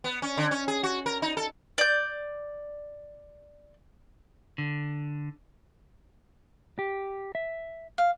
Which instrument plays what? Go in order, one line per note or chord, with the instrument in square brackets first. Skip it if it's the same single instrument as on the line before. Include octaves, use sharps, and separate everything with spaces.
[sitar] B3
C#4
D3
C#4
G#4
F#4
A#4
D#4
A4
[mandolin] D5 G6
[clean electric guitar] D3
G4
E5
[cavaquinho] F5